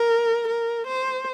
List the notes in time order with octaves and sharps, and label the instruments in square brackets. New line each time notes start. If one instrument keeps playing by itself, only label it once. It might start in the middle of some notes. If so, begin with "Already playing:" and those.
Already playing: [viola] A#4
A#4
C5